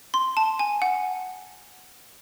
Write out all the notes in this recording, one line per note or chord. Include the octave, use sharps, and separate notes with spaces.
C6
A5
G#5
F#5